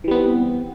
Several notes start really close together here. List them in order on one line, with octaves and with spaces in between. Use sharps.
E3 G3 B3 C4